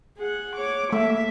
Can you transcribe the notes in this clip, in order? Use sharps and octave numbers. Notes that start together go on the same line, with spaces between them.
G#4 F#5
C#5 D6
A3 A#3 E5